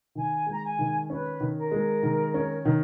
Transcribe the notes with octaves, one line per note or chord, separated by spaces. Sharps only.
D#3 G#5
G#3 A#5
G#5
D#3
C#4 B4
D#3
A#4
G#3
D#3
C#4
D#3